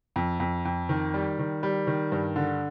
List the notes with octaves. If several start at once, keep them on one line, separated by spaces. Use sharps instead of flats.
F2
F2
F2
D#3
G3
D#3
G3
D#3
G2
D3